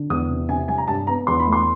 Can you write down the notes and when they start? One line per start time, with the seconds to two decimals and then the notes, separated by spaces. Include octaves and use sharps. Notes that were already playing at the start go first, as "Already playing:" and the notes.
Already playing: D3
0.10 E2 D#6
0.29 C3
0.49 C3 G#5
0.68 G3 G#5
0.78 A#5
0.88 G2 A5
1.07 B3 A#5
1.27 E2 C6
1.39 B5
1.46 A3
1.52 C6